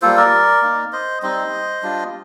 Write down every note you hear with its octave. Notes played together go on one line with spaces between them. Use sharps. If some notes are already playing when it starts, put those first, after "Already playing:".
G3 A#3 F4 A4 C5
A#4 D5
A#3 D#4
C5 D#5
G3 C4 D#4 C5 D#5
G3 D4 F4